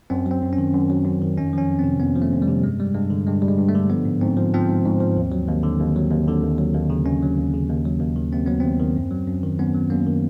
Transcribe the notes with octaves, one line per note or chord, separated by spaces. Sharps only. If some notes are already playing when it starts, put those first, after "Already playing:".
F#2 C4
F#3
C4
F#2
C#4
D#3
F#2
F#3
F#2
D#3
F2 C#4
F3 C#4
F2
C4
C3
F2 B3
F3
A3
F2
G3
C3
G2 G#3
G3
G2 G#3
D3
G2 G#3
G3
G#3
G2
A3
D3
F3 B3
G#2
G#2 C4
F3
F3 C4
G#2
G#2
F3
D#2
F#3
D#2
D3
D#2
F#3
D#2
D3
D#2
F#3
D#2
C#3
D#2 C#4
F#3
D#2
C#3
D#2
F#3
D#2
D#3
D#2 C4
F#3 B3
D#2 C4
D#3
F#2
F#3
F#2
D#3
F#2 B3
F#3
F#2 A#3
D#3